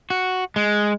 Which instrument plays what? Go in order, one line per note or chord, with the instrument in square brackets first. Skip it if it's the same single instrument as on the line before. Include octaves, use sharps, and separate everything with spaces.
[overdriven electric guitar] F#4
G#3